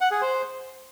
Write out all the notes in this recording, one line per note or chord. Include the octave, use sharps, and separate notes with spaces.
F#5
G#4
C5